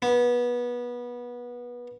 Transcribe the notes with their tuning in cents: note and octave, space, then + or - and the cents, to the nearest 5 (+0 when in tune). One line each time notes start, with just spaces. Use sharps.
B3 -20